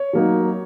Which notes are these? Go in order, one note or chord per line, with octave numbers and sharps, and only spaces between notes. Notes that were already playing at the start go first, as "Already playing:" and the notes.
Already playing: C#5
F#3 A#3 D#4